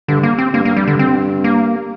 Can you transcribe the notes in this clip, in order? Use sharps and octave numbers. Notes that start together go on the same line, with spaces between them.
G2 D3
A#3
C4
G2 A#3
A#3
G3
D3
C4
A#3